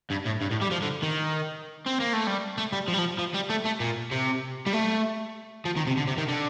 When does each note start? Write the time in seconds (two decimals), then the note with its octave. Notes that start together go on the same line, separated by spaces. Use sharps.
0.10 G2
0.25 A2
0.41 G2
0.51 A2
0.61 G3
0.71 F3
0.82 D3
1.03 D#3
1.86 C4
2.00 A#3
2.13 A3
2.27 G3
2.58 A3
2.72 G3
2.88 F3
2.94 G3
2.99 F3
3.19 F3
3.34 G3
3.50 A3
3.65 A3
3.80 A#2
4.12 C3
4.67 G3
4.73 A3
5.65 F3
5.77 D#3
5.87 C3
5.97 D3
6.07 C3
6.18 D#3
6.28 D3